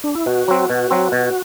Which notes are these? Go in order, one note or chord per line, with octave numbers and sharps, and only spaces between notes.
D4
E4
B2 F#4
F#3 C4
B2
F#3 C4
B2